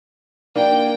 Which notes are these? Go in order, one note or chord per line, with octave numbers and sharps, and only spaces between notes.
A#3 D4 G5